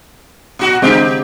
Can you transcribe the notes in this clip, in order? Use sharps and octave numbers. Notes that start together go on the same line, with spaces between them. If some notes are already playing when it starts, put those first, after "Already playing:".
A#2 F#4
C#3 G#3 C4 G4 F5